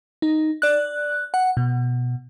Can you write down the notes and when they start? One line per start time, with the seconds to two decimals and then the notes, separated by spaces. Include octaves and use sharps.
0.22 D#4
0.62 D5 F#6
1.34 F#5
1.57 B2